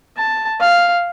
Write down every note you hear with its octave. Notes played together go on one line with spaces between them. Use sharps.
A5
F5